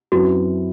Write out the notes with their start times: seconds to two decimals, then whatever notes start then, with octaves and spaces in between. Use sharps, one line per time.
0.12 F#2 F#3 C4 E4 F#4 B4